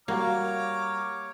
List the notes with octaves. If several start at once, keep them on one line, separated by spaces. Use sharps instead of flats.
G3 A#3 F#4 C#5 A#5 D6 F6